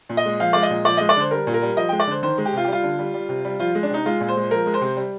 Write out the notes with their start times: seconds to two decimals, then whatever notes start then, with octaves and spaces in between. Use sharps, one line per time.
0.09 A#2
0.17 D#5
0.25 G#3
0.40 F3 F5
0.53 G#3 D5
0.63 D#5
0.70 A#2
0.85 F3 D5
0.97 G#3 D#5
1.09 D5
1.16 D3 C5
1.31 G3 A#4
1.47 A#2
1.54 A#4
1.62 G3
1.77 F3 D#5
1.89 G#3 G5
2.00 D5
2.07 D3 C5
2.23 D#3 C5
2.38 G#3
2.45 G4
2.53 C3 F4
2.64 G4
2.68 G3 F4
2.83 D3
2.99 G3
3.14 G3
3.29 C3
3.45 G3
3.60 F3 F4
3.75 G#3
3.83 D4
3.90 C3 D#4
4.06 G#3 F4
4.21 A#2
4.29 C5
4.37 G#3
4.51 F3 A#4
4.66 G#3
4.74 C5
4.81 C3
4.97 G3